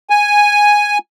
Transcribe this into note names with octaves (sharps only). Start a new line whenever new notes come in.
G#5